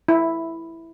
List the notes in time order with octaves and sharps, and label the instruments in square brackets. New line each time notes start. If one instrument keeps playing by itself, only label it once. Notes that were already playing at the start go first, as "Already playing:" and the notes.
[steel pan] E4